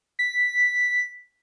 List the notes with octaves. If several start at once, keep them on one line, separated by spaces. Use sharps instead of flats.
B6